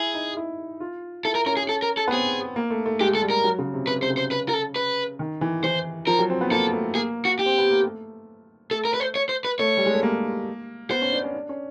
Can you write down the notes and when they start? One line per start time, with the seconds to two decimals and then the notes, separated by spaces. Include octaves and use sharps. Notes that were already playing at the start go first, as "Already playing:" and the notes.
Already playing: E4 G#4
0.14 D#4
0.37 E4
0.80 F4
1.24 E4 A4
1.35 A#4
1.46 C#4 A#4
1.57 G#4
1.69 A4
1.82 A#4
1.97 A4
2.08 B3
2.12 C4 G#4
2.56 A#3
2.70 A3
2.86 A3
3.00 G#3 G4
3.15 A4
3.22 G3
3.30 A#4
3.44 F#3
3.59 C#3
3.74 C3
3.87 C3 B4
4.01 C3 C5
4.10 C#3
4.17 C5
4.31 B4
4.49 A#4
4.53 A4
4.76 B4
5.19 D#3
5.41 E3
5.63 E3 C5
6.07 F3 A#4
6.19 F#3
6.30 C4
6.41 B3
6.51 A#3 A4
6.73 A3
6.95 A#3 G#4
7.25 F#4
7.39 G4
7.46 C4
7.58 B3
7.71 A#3
7.83 A3
8.71 A3 A4
8.85 A#4
8.94 B4
9.00 C5
9.16 C#5
9.29 C5
9.45 B4
9.59 A3 C#5
9.77 G3
9.86 G#3
9.94 A3
10.03 A#3
10.90 B3 C5
11.02 C#4
11.12 D4
11.24 C#4
11.34 D4
11.49 C#4